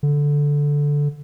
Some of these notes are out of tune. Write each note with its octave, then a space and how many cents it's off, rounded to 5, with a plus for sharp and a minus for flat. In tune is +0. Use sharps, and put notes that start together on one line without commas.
D3 -10